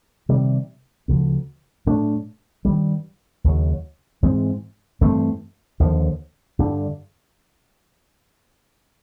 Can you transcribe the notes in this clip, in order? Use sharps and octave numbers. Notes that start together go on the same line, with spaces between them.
C3 D#3 G3
D2 C#3 F3
A2 F#3 A3 D4
G2 D#3 G3
D#2 C#3 F#3
G#2 E3 G#3 C4
G2 E3 A3 C4
D#2 D3 F3
G2 D3 G3